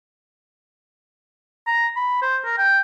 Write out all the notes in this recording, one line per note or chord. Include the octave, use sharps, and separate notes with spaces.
A#5
B5
C5
A#4
G5